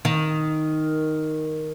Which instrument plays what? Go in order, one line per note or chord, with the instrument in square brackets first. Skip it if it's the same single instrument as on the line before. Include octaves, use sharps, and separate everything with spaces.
[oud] D#3